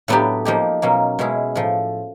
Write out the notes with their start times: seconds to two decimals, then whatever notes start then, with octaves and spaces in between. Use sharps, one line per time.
0.08 A2 F#3 B3 D4 G4
0.45 F3 A#3 D#4 G4
0.82 B2 F#3 A#3 C#4
1.19 B2 G#3 C#4 E4 G#4
1.55 A2 F3